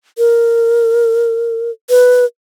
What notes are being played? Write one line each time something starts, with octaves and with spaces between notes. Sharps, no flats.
A#4
B4